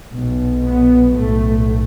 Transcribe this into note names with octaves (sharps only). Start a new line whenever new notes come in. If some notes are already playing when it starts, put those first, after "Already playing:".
B1 B2
B3
B1 A2 A3